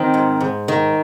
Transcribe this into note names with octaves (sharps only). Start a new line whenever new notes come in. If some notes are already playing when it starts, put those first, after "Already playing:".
Already playing: D#3 C4
G#2
G#2
D#3